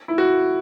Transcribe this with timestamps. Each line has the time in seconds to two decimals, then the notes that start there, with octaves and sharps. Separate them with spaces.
0.08 E4
0.18 F#4